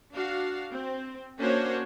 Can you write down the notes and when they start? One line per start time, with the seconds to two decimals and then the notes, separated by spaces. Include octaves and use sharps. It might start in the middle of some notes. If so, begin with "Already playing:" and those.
0.13 D4 F#4 F5
0.73 C4
1.39 A#3 C#4 D4 F#4 C5 C#5